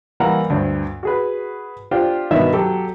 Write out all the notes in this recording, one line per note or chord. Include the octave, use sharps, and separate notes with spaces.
E3 G3 A#3 A#4 F5 F#5
D2 G2 C5
F#4 G#4 B4
D4 F4 G4 C5
G2 B2 D#3 B4 D#5 E5
F#3 G4 A4